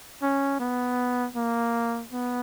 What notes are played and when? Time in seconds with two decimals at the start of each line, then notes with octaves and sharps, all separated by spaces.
0.22 C#4
0.60 B3
1.36 A#3
2.13 B3